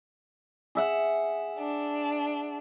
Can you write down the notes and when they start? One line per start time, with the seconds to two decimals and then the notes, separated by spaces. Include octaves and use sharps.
0.75 G#4 E5 F#5
1.59 D4